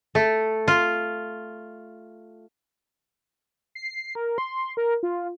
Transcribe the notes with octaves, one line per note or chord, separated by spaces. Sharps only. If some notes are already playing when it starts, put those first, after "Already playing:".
A3
F4
C7
A#4
C6
A#4
F4